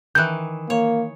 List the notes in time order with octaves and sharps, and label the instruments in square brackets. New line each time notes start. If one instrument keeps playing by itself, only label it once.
[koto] D#3 E3 [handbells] F#6 G6
[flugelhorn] A#3 [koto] C#5